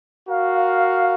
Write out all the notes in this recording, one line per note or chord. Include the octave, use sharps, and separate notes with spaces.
F#4 A#4 F5